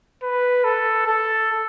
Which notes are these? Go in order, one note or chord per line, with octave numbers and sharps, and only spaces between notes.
B4
A4
A4